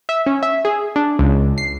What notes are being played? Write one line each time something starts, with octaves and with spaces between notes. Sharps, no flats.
E5
C#4
E5
G#4
D4
C#2
C7